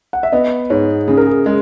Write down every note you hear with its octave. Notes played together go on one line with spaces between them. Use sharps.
F#5
E5
B3 D#5
G#2 C#5
C#3 G#4
A#4
G#4
G#3 G#4